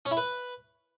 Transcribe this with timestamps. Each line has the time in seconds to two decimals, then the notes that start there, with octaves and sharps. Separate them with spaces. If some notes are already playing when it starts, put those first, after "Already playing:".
0.05 C#4
0.11 E4
0.17 B4